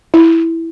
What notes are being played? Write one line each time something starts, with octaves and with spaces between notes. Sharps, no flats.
E4